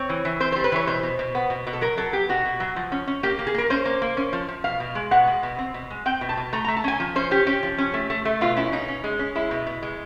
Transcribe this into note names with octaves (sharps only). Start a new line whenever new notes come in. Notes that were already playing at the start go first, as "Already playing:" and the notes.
Already playing: C4 C#5
E3
E3
C4 C5
C5
G3
B4
E3 C#5
B2 C5
B2
B2
B3
B2
B2
A4
F#3 A#4
F#3 A4
B3 G4
B2 F#4
B2
F#3
F3
C#4
C#4
A#3 G4
A#3
G#4
A#3 A#4
C#4 C5
A#3
A#3
C#4
F3
F3
B2 F5
B2
G#3
B2 F#5
G#3
B2
C4
B2
G#3
C4 G5
B2
A5
B2
A3 A#5
A#5
A3
A5
C#4 G#5
F3
C#4 C5
C#4 G4
C#4 G4
F3
C#4
A3
A3
A3
B2 F4
C#4 E4
B2 D#4
C#4
G#3
C#4
G#3 E4
B2
B2
G#3